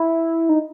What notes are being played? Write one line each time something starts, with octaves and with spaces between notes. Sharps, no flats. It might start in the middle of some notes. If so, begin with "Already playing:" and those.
Already playing: E4
D#4